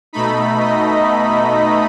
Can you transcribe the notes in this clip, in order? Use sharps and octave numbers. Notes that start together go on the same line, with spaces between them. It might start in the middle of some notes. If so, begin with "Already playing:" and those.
B2 A3 D#4 B5
D#5